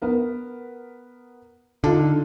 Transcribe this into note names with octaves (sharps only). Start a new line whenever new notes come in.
B3 A#4
D3 D#4 F4 A4